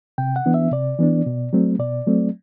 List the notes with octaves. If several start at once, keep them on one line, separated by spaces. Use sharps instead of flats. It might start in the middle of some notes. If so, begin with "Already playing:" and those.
C3 G5
F#5
E3 B3 D4
E5
C3 D5
E3 B3 D4
B2
F#3 A3 C4
B2 D5
F#3 A3 C4